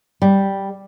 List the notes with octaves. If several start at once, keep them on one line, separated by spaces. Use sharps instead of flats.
G3